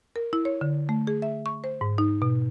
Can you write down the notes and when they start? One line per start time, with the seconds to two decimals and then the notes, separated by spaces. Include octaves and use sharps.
0.16 A#4
0.33 E4
0.45 C#5
0.61 D3
0.89 A3
1.07 G#4
1.22 E5
1.46 C#6
1.64 C5
1.81 G#2
1.98 D#4
2.22 B2